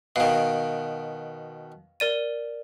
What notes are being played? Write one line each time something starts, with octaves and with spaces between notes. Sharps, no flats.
B2 D#3 F5
A#4 D5 D#7